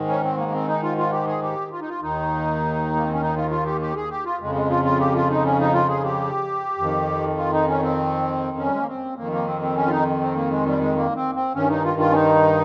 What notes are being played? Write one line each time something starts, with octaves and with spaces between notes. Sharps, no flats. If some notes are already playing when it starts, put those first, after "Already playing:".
Already playing: G#2 D#3
C#4
C4
A#3
A#3
C4
D#4
F4
F4
G4
G#4
G4
F4
D#4
F4
D#2 D#3 D#4
A#3
C4
C#4
D#4
F4
F4
G4
G4
G#4
G4
F4
F2 C#3 G#3
G#3
F4
F4
G4
F4
D#4
C#4
D#4
F4
G#4
G4
F2 D#3
F4
D#4
C#4
C4
C#4
G3
G#3
A#3
C4
F2 D#3 A#3
A#3
C4
C4
C#4
F4
D#4
C4
A#3
G#3
G3
G#3
A#3
C4
C4
G2 D#3 C#4
D#4
F4
F4
C#4
D#4